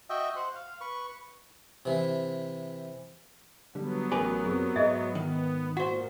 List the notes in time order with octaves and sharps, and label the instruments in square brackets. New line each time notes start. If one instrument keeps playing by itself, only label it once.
[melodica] F#4 D#5 E5 G5
C5 F#5
F5
B4 C#6
[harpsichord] C3 E3
[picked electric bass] D3 G3 [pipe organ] F#3 B3
[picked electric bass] A1 C#3 [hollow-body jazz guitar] G4 A#4 B4 [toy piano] G#5
[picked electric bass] F#2 C4 [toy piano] G#4
[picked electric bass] G#2 [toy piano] G#4 D#5 E5
[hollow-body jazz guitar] D#3 [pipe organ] B3
[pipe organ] A#2 [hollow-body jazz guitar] F#4 C5 [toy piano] F#5